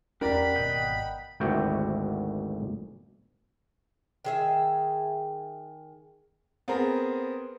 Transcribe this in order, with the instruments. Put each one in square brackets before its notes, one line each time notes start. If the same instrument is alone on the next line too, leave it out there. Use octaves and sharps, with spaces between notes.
[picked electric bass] E2 C#4 [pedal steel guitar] G4 F#5 [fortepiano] A#4 D5 [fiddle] B5
[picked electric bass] G#1 B2 [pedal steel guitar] D#5 F#5 G5
[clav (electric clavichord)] G#1 D2 E4 F#4 G4 G5
[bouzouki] D#3 G#4 E5
[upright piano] B3 C4 G#4 A#4